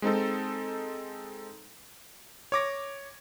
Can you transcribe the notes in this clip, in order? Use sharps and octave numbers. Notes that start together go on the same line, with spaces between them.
G#3 C4 D#4 A4
C#5 D6 A#6